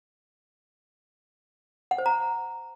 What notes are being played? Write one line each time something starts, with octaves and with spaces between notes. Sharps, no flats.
F#5
C5
A#5